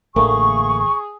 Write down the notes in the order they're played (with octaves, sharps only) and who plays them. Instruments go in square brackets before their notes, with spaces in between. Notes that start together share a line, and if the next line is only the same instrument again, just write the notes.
[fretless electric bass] A1 [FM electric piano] D3 A3 A#3 [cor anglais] G#4 [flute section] C#6